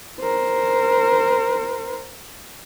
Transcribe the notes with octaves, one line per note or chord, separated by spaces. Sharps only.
A#4 C5